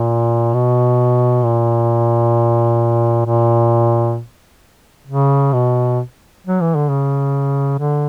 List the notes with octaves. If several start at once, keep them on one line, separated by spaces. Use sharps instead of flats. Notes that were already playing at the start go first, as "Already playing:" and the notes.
Already playing: A#2
B2
A#2
A#2
C#3
B2
F#3
E3
D3
C#3
D3